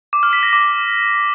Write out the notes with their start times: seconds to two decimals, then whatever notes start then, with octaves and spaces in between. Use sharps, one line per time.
0.13 D6
0.23 F6
0.33 B6
0.43 A#6
0.53 D6